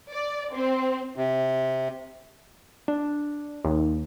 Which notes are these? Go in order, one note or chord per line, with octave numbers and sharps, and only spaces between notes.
D5
C4
C3
D4
D#2